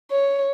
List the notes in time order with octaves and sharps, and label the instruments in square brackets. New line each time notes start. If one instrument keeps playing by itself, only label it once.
[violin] C#5